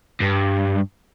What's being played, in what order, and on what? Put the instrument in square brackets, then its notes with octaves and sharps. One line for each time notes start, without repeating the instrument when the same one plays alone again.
[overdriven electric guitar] G2